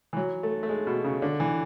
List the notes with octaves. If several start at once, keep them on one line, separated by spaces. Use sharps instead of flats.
E3
F#3
A3
A3
G#3
B2
C#3
D3
E3